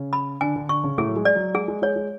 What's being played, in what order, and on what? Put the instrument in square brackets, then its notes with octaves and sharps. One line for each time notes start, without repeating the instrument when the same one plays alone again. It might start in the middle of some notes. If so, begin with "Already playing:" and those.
Already playing: [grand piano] C#3 C#4
[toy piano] B5
[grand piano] D3 D4 [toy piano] G#5
[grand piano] D3 D4
[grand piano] D3 D4 [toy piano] C#6
[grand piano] C#3 C#4
[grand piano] A2 A3 [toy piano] G#4
[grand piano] F#3
G#3
[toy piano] D5
[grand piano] F#3
[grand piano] G#3 [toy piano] G#4
[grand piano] G#3
[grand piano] G#3 [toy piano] C#5
[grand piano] G#3